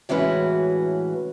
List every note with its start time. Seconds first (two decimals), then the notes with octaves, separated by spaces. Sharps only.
0.09 A2 E3 G#3 C#4 F#4 B4